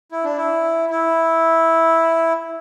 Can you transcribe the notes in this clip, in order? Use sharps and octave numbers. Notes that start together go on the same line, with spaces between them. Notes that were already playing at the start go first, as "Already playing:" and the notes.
E4
D4
E4
E4